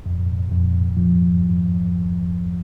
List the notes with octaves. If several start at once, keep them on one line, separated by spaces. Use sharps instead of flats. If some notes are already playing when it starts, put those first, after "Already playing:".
F2
F2
F3